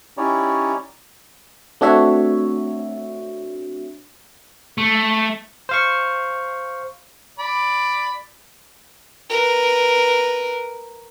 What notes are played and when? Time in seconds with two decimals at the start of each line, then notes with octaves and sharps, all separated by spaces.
0.17 C#4 D#4 E4 G4 C#5 D5
1.81 A3 C4 D4 F#4 C#5 E5
4.78 A3
5.69 C5 F5 C#6
7.39 D5 B5
9.30 A#4 B4